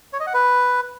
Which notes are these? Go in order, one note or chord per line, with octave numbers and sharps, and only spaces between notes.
C#5
D#5
F#5
B4